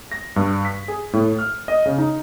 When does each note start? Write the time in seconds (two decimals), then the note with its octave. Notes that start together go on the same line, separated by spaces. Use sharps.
0.11 A#6
0.36 G2
0.65 B6
0.88 G#4
1.13 A2
1.39 F6
1.68 D#5
1.86 C#3
1.98 D#4